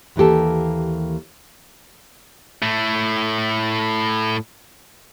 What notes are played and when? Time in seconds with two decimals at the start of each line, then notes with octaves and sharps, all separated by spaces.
0.16 D#2 E3 A#3 G4 A4
2.62 A2 A3